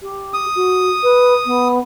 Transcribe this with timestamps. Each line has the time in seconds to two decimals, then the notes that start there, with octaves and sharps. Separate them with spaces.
0.01 G4
0.34 D#6
0.55 F#4
1.03 B4
1.45 B3